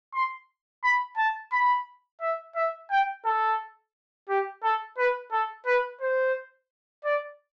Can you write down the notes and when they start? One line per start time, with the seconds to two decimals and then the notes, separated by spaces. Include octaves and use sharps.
0.15 C6
0.84 B5
1.17 A5
1.52 B5
2.21 E5
2.56 E5
2.90 G5
3.25 A4
4.29 G4
4.63 A4
4.98 B4
5.32 A4
5.67 B4
6.01 C5
7.05 D5